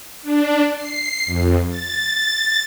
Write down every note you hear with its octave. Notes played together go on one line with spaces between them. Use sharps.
D4
C7
F2
A6